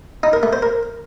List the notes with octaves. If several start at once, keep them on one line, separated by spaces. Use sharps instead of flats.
D#4
A#4
A3
C5
A#4